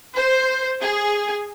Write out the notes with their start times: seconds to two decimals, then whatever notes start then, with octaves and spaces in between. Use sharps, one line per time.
0.13 C5
0.81 G#4